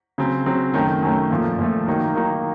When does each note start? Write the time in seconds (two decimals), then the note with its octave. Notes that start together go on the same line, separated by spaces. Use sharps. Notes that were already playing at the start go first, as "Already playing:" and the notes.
0.18 C#3 F#3 C4
0.46 C#3 F#3 C4
0.74 F#2 D#3 A3 C#4
1.02 F#2 D#3 A3 C#4
1.30 A#2 F3 A3
1.59 A#2 F3 A3
1.87 D#3 F#3 A#3 D#4
2.15 D#3 F#3 A#3 D#4